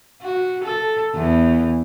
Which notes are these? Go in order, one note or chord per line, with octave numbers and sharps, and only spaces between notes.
F#4
A4
E2